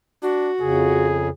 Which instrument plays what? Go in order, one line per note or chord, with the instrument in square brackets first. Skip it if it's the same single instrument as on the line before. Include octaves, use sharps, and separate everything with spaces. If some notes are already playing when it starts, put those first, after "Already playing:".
[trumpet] D4 [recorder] F#4
[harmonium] F2 C#3 [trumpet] G#4